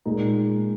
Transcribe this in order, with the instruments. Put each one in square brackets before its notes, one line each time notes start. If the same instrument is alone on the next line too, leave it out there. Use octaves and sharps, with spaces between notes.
[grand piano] A#2 G#3 D#4